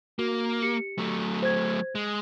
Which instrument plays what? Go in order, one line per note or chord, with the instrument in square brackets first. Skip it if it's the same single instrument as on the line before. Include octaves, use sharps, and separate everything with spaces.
[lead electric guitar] A#3 [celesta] F#4
[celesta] G4 C#7
[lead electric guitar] F#3 A3
[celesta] C5 G#6
[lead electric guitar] G#3